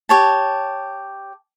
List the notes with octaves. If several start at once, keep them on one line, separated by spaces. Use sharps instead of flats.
G4 C#5 A5